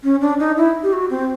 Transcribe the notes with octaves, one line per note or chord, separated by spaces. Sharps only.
C#4
D4
D#4
E4
G4
F#4
C4